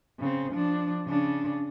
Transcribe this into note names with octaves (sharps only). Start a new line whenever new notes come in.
C#3 C4
F3 D4
C#3 D4